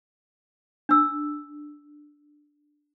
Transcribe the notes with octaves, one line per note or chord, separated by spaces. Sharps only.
D4 E6